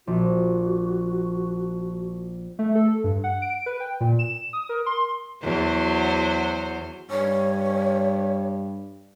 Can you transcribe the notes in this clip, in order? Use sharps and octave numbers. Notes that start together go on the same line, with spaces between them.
A#1 F#4
A3
A4
G2
F#5
D7
B4
G5
A#2
E7
D#6
A#4
C6
E2 F#3 C5
G2 C#5